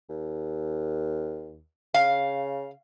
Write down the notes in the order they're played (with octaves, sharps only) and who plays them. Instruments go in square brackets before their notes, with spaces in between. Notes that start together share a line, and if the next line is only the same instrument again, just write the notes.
[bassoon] D#2
[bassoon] C#3 [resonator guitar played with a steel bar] F5